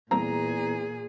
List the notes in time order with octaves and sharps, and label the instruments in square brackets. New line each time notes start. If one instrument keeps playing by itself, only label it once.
[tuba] E2 [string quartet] A#2 G#4 [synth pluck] G3 A#3 C4 [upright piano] A#5